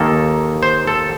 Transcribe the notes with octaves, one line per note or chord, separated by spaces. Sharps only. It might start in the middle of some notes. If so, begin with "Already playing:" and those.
Already playing: D#2 D#3 A#3 A4
C5
A4